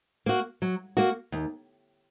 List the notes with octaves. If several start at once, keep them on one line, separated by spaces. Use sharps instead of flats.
A#3 F#4
F#3
A#3 F#4
D#2